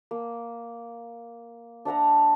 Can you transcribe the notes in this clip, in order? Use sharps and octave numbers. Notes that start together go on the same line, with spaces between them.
A#3
D4 E5 F#5 A#5